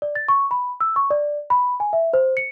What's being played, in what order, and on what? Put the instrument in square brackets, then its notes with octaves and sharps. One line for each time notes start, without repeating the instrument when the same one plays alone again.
[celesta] D5
A6
C#6
B5
E6
C#6
D5
B5
G#5
E5
C5
C#7